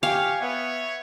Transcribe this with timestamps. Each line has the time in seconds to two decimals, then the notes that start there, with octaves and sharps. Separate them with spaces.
0.03 G4 C#5 F5 G#5
0.41 B3 C#5 E5